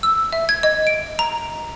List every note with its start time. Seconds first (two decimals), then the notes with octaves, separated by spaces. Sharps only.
0.03 E6
0.33 E5
0.49 G#6
0.63 D#5
0.87 D7
1.19 A#5